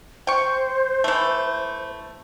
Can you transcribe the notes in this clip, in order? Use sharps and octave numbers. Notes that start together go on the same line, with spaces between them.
C5 G5 C#6
E3 A3